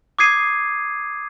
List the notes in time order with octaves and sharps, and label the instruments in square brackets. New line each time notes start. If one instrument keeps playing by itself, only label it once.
[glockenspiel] D6 D#6 G#6 C7 D#7